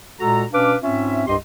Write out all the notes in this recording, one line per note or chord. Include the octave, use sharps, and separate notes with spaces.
A#2 G#3 F#4 A4 A#5
B2 C#4 D4 B4 F5 D6
G#2 C4 C#4 F4 E5
C2 G2 G4 D#5 C6